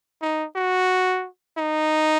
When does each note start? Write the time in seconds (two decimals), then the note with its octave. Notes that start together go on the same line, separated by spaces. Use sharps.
0.22 D#4
0.56 F#4
1.57 D#4